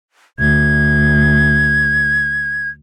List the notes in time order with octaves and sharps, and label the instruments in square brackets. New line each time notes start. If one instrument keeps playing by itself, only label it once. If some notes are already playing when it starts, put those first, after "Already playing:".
[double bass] D2 [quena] G#6